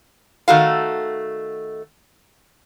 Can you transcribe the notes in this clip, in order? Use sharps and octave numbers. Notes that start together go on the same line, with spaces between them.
D#3 A3 F#4 F5